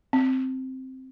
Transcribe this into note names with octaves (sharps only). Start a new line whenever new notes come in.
C4